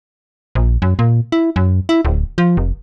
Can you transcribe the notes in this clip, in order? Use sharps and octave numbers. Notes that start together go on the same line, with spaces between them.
A#1
F#2
A#2
E4
F#2
E4
D1
F3
F1